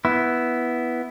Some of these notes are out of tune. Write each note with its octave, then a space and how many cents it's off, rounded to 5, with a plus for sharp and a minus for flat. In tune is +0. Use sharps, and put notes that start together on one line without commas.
B3 +0 E4 +0